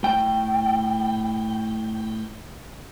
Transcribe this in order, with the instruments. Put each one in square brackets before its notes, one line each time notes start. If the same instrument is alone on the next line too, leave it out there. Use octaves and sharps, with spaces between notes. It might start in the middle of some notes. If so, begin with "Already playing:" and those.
[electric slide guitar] A2 G5